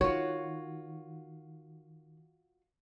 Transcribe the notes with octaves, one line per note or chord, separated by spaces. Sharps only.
D#3 F4 F#4 C#5